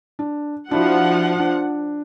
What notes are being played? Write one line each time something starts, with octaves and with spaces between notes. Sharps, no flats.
D4
F3 D4 E4 F#4 F#5
D4